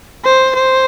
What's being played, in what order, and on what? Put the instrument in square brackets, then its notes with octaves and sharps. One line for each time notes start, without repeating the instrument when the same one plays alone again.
[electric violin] C5
C5